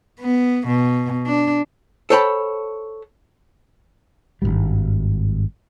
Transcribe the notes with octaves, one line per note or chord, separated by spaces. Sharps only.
B3
B2
D4
A4 C5 C#5 G5 A5 B5
G#1 E2 G2 G3